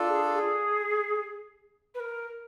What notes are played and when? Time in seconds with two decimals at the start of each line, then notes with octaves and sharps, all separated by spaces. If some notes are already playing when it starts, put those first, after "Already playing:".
Already playing: D4 F4 A4
0.08 G#4
0.33 G#4
1.94 B4
2.00 A#4